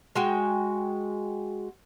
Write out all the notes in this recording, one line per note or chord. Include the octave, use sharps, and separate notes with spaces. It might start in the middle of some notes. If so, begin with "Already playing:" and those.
G#3 F#4 G5